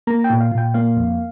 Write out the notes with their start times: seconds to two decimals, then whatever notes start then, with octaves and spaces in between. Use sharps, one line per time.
0.07 A#3 A#5
0.24 G5
0.30 A#2
0.41 F5
0.52 A#2
0.58 G5
0.74 A#3 F5
0.97 F2